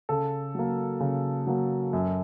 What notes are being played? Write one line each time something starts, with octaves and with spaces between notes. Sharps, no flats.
C#3 A4
F#3 A#3
C#3
F#3 A#3
F#2